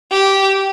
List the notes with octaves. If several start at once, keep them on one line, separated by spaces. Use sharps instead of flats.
G4